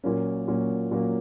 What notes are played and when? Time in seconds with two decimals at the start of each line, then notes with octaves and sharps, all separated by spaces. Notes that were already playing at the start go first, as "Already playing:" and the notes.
0.04 A#2 F#3 A#3 C#4
0.47 A#2 F#3 A#3 C#4
0.91 A#2 F#3 A#3 C#4